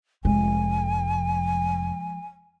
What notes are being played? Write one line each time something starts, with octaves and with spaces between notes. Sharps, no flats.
F1 F3 G#3 G#5